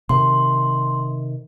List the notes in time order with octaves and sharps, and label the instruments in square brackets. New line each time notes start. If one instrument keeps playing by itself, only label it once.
[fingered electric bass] C3 D#3 [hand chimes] C6